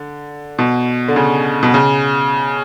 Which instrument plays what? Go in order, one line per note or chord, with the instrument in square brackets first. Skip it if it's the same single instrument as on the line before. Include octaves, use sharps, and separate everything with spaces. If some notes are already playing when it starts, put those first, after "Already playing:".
Already playing: [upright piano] D3
B2
D3
C#3
B2
C#3